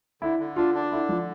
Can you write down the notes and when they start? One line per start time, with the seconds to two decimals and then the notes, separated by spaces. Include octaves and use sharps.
0.22 D3 E4
0.39 D3
0.56 D4 F4
0.75 D4
0.92 D3 E4
1.09 F3